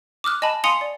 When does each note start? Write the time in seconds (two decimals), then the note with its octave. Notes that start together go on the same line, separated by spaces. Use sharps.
0.24 D6 D#6 F6 F#6
0.42 D#5 G#5 A5 B5
0.64 F5 G#5 C6 D#6 C#7 F7
0.81 D5